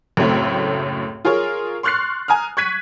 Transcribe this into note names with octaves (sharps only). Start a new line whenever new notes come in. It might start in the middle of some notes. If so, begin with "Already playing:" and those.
C#2 F#2 A2 A3 C4 C#5
F4 G#4 A#4 C#5
C6 C#6 F6 F#6 A6 C7
G#5 A#5 D#6 F6
C#6 F#6 G#6 B6 D#7